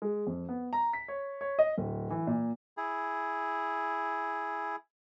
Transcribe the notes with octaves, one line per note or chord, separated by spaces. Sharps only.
G#3
F2
B3
A#5
B6
C#5
C#5
D#5
D1
E3
A#2
E4 G#4